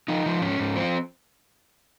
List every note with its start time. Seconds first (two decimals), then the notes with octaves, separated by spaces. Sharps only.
0.08 F3 D#4
0.26 F3
0.42 G#2 C#4
0.60 G#2
0.76 F3 C4